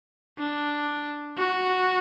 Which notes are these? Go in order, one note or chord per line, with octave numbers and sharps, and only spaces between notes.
D4
F#4